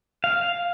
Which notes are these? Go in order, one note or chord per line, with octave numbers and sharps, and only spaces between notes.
F5